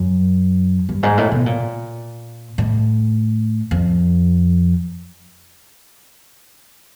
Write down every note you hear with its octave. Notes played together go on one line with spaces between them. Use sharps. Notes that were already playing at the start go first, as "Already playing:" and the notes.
Already playing: F#2
G2
G#2
A2
B2
A#2
A2
F2